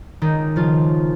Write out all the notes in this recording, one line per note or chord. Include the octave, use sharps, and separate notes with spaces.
C#2 D#3 D#4
C#3 F3 F4